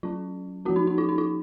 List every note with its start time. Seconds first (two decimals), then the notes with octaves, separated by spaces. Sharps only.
0.03 F#3 C#4 F4
0.65 F3 A#3 C#4 F#4
0.76 D#4
0.87 D#4
0.98 F4
1.09 D#4
1.18 F4